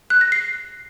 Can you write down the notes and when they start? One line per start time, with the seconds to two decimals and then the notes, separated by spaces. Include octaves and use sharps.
0.10 F#6
0.21 A#6
0.32 C7